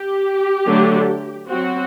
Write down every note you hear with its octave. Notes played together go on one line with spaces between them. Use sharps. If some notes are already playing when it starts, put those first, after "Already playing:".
Already playing: G4
D3 F#3 A3 D4
F#3 C4 F#4